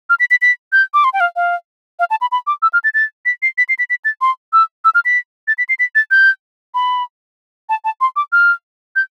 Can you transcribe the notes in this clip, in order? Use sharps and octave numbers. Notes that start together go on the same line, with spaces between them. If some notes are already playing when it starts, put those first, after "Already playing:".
F6
B6
B6
B6
G6
D6
C6
G5
F5
F5
F5
A5
B5
B5
D6
E6
F6
A6
A6
B6
C7
B6
C7
B6
B6
A6
C6
E6
E6
F6
B6
A6
B6
C7
B6
A6
G6
B5
A5
A5
C6
D6
F6
G6